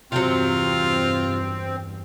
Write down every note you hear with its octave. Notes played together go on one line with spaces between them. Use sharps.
E2 G2 C3 F#3 C4 F4